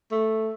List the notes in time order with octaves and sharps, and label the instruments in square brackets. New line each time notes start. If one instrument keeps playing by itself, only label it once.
[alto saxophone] A3